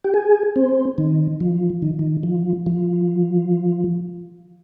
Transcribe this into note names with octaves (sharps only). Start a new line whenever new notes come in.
G4
G#4
C4
D#3
F3
D#3
D#3
F3
F3